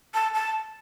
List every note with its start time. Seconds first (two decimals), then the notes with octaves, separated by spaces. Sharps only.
0.14 A5
0.34 A5